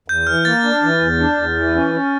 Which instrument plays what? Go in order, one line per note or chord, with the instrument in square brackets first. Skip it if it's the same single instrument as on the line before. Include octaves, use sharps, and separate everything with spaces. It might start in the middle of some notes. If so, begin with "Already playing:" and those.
[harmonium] E2 [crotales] G6
[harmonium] E3 [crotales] F6
[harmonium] A#3 [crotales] A6
[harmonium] D4
E3
E2
D4
E2
E3
C#4
C#4